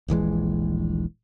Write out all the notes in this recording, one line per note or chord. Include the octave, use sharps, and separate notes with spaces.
D#1 A#1 E3 G#3